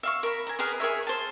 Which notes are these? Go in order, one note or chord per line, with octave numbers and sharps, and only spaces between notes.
E5 F5 C#6
A#4 B5
G#5 A#5
G#4 A#4 B4 D#5
G#4 A#4 C#5 E5
C5 A5